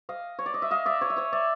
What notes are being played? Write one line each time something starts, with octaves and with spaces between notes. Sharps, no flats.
D#5 F5
C#5
D5
D#5
E5
D#5 F5
D5 E5
C#5 D#5
E5
C#5 D#5
D5 E5